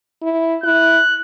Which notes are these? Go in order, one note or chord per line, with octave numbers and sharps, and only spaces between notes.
E4
E4 F#6